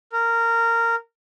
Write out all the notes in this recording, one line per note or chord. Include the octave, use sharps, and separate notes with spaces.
A#4